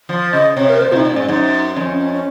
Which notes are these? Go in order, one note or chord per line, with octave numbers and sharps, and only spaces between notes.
F3
C#3 D#5
C3 C#5
A#4
A#2 C5
C3 D#4 F4
A#2
G#2 C#4
F#2 D#4
F2 C#4
C#4
C#4